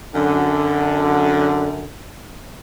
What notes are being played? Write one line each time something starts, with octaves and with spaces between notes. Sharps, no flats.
F#2 D3